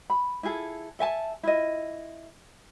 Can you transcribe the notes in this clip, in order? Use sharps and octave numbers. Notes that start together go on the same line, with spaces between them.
B5
E4 F4 G#4 A4
A4 E5 G#5 A5
E4 F4 D#5